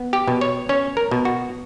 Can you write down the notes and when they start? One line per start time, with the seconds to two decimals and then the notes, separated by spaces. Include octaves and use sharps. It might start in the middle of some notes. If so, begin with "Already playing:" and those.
Already playing: B3
0.13 G4
0.28 B2
0.41 C#5
0.69 C#4 C#5
0.97 A#4
1.11 B2
1.25 F#4